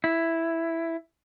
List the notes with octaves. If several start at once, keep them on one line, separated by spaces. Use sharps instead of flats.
E4